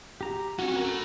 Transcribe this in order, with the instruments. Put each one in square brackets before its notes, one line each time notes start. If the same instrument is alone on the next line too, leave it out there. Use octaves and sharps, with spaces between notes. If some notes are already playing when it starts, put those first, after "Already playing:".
[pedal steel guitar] G4 A#5
[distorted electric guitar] C4 C#4 [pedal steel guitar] F#4
[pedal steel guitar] F#4 A#4
[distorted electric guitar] A4 B5